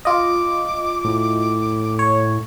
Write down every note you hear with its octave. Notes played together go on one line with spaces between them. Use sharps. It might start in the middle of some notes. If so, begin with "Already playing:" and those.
F4 D#5 D6
A2
C#5